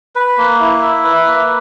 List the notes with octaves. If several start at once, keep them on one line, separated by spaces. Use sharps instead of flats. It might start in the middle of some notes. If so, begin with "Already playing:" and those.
B4
A#3
E4
E5
B4
A#3